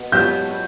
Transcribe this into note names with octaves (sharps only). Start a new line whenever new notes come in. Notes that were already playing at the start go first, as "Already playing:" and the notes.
Already playing: B2
F#3 B3 E4 G6